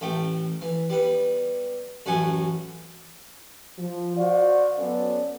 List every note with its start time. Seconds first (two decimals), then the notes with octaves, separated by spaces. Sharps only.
0.01 A1 A3 G5
0.61 E3
0.90 G3 B3
2.06 A1 F#2 A3 F#5 G#5
3.78 F3
4.17 F#4 C5 D5 F5
4.78 F#3 B3 C#4 A4 D5